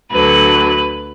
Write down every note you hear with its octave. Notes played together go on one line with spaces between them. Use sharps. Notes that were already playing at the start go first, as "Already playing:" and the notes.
D2 D3 F#3 B4